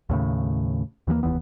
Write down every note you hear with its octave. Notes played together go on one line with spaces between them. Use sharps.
D#2 A2 C#3
D#2 E3 F#3 A#3
F1 D#2 E3 B3